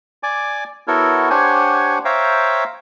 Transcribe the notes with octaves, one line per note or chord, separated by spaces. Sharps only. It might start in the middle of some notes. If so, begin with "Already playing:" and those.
D5 G#5 D6
B3 E4 F#4 A4 A#4 C#5
D4 G4 C5 C#5 F#5 G#5
C5 C#5 E5 F5 G5 A#5